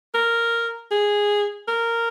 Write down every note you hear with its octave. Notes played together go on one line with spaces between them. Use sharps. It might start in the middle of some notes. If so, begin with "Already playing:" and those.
A#4
G#4
A#4